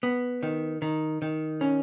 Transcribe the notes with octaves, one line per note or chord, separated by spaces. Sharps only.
B3
D#3
D#3
D#3
C#4